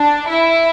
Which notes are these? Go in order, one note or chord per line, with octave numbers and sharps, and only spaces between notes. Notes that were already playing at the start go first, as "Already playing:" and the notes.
Already playing: D4
E4